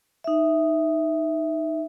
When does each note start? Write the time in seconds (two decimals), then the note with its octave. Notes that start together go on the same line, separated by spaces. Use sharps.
0.24 D#4 E5